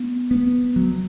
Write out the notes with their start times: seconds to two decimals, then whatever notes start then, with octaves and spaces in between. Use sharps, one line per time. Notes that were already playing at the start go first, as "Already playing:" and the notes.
Already playing: B3
0.31 B3
0.76 F#3